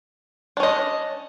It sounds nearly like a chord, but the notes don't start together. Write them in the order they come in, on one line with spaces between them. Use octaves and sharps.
D4 C#4 D#5